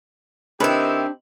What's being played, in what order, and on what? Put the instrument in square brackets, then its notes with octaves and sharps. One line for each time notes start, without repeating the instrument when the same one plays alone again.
[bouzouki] D#3 E4 [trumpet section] C4 G4 [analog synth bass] D4 [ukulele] B4